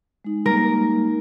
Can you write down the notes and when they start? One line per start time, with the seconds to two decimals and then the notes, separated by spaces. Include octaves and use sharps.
0.24 G#3 D#4
0.46 G3 A#3 A#4